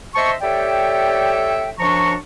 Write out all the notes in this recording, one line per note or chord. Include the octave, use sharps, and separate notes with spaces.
C5 D#5 E5 A5 C6 C#6
G4 A4 C#5 D5 E5 G5
F#2 F3 D4 A#5 C#6